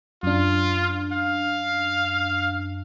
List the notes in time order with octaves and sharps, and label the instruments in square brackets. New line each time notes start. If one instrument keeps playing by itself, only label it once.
[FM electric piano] F#2 D4 [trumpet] F4
[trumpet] F5